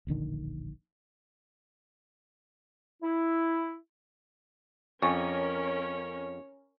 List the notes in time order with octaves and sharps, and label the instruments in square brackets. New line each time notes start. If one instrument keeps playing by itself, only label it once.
[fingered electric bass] D1 A#1 D3 D#3
[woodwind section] E4
[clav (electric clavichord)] F2 [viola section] C#4 A#4 [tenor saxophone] C#5 [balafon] G#5 C#6